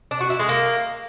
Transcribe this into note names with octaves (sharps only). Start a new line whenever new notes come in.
D4
F#4
E4
G#3
A#3